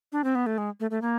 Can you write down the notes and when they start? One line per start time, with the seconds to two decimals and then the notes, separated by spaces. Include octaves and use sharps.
0.12 D4
0.24 C4
0.35 B3
0.46 A3
0.58 G#3
0.80 A3
0.91 A3
1.02 A#3